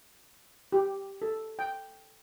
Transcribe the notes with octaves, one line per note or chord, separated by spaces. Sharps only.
G4
A4
G5